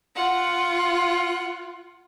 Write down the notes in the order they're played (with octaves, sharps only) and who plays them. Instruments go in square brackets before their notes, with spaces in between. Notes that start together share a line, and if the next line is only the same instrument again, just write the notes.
[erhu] F4 [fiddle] F#5